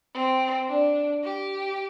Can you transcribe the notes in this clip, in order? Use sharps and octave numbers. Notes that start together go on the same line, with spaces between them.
C4
D4
G4